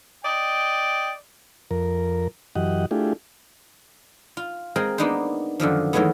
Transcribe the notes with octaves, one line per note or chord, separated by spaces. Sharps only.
D5 D#5 G5
F2 A#4
F#2 E3 G4 D#5 F#5
A3 D4 E4 F4 G4 G#4
F4
G#3 C4 G#4 A#4 C5
A#3 B3 D4 D#4 B4 C5
F#2 D3 D#3 F3
D#3 E3 F#3 G#3 A3 B3